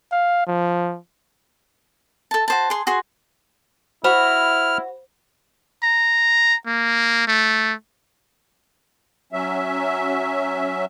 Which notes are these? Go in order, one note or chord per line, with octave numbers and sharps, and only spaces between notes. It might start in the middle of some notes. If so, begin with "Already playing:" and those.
F5
F3
A4 A5
F#4 C5 A5
G#4 C6
F#4 G#4 C6
E4 F#4 C5 B5 F6
A#5
A#3
A3
F#3 C#4 E5